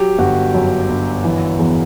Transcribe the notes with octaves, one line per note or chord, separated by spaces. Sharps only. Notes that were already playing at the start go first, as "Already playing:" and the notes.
Already playing: F#3 G4
G1 F#4
F#2
G1
E3
E2